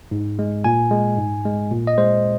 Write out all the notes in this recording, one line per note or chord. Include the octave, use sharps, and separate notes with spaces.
G#2
G#3
A#2 G#5
G#3
G#2
G#3
A#2
D#5
G#3 C5